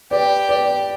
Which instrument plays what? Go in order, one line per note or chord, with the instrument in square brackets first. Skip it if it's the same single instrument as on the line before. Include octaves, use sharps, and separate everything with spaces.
[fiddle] G4 [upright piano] B4 D5
[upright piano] B4 D5